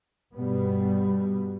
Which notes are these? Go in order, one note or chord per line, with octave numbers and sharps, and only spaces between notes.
G2 B2 G3 B3